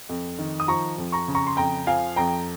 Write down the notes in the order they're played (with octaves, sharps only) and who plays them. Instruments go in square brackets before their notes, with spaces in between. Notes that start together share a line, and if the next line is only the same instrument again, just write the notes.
[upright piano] F2
D#3
D#6
F3 A#5 C#6
F2
A#5 C#6
C#3
A#5 C#6
C6
F2 G5 A#5
F3 F5 G#5
F2 G5 A#5